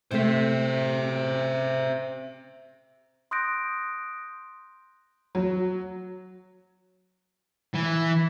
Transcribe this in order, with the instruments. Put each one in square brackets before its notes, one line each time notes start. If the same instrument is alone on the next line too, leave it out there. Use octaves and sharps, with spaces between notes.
[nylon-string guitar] C3 A3 [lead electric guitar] C5 E5
[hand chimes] C6 D#6 F#6 G6 A#6 D7
[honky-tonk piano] F#3
[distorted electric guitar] E3